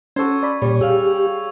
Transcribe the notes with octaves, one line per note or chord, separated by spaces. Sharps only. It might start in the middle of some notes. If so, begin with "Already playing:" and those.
C#4 F#4 A4 C5 C#6 G#6
D5 B5
A#2 G3 C#4 C#5
G4 G#4 F5 E6 F7